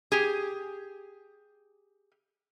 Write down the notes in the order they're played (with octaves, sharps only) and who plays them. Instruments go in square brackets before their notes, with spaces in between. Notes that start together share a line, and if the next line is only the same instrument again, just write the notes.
[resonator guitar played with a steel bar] G4 G#4